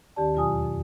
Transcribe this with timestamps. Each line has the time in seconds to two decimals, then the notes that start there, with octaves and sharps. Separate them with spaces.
0.16 D#2 D#3 C#4 G4 D5 A5
0.34 E2 B2 F#3 F4 G#5 D#6
0.63 F2